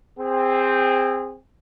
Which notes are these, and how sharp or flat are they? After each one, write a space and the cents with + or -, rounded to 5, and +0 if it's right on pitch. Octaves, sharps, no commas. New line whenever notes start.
C4 +0 G#4 -25